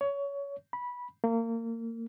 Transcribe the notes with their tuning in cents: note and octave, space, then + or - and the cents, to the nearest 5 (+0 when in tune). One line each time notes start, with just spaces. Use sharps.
C#5 +20
B5 -15
A#3 -30